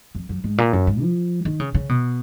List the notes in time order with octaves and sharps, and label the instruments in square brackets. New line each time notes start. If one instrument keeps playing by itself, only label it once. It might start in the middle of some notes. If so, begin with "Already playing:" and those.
[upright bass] F2
F#2
G#2
A#2
F#2
G#2
F3
D#3
C#3
C#3
B2